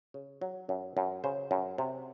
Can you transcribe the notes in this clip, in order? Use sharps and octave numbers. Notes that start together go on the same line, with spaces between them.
C#3
F#3
F#2
F#2
C#3 C5
F#2
C3